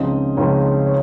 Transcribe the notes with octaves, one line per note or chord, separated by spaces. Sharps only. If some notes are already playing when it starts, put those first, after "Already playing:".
Already playing: C#2 C#3 F3 C4 D#4 D#5
C#2 C#3 F3 C4 D#4 C#5
C#5